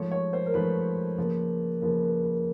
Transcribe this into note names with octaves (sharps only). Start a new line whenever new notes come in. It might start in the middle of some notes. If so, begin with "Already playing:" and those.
Already playing: G#2 F3 A3 C#5
C#5
C5
A#4
G#2 F3 A3 B4
C#3 F3 A#3
C#3 F3 A#3 B4
B4
B4